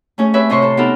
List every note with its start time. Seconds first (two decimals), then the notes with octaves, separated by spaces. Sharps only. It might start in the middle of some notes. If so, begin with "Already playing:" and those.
0.18 A3 C#4 G#4 C#5
0.34 C4 G4 B4 C#5 E5
0.49 A2 C3 C5 D#5 C6 C#6
0.62 A4 C5
0.77 B3 C4 D#4 G4 A4 A#4